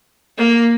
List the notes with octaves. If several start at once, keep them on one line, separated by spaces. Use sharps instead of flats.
A#3